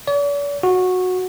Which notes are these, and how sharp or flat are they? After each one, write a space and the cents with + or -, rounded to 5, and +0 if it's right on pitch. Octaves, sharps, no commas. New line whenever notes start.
D5 -45
F#4 -15